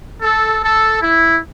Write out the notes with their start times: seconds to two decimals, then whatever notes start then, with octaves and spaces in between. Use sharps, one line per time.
0.21 A4
0.61 A4
1.02 E4